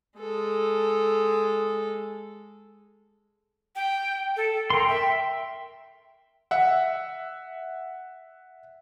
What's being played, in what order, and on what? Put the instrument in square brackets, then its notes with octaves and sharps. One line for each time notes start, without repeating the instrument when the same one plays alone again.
[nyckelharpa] G#3 A4
[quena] G5
A4
[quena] A#4 [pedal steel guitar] G5 C6
[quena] E5
[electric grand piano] E5 F#5